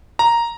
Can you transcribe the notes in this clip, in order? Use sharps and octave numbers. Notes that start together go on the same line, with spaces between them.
A#5